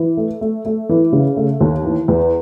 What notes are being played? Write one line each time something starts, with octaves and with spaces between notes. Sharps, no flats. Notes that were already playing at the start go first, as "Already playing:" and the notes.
Already playing: E3
A3
A3
A3
E3
C#3
A3
D#2
E3
E2